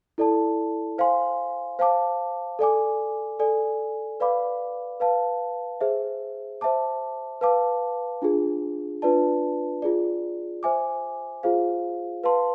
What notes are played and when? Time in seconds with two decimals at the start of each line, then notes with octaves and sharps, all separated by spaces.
0.18 E4 A4 D5 A5
0.98 C5 F5 G#5 C6
1.79 C5 F5 A5 D6
2.59 A4 D5 G#5 D6
3.39 A4 D5 G#5
4.20 B4 D5 F5 B5 D6
5.00 B4 F5 A5
5.81 G#4 C5 E5
6.61 C5 E5 A5 D6
7.41 B4 F5 A5 D6
8.22 D4 F4 G#4
9.02 D4 F4 B4 D5 A5
9.82 F4 G#4 D5
10.63 C5 E5 G#5 D6
11.43 F4 G#4 C5 F5
12.24 B4 F5 A5 C6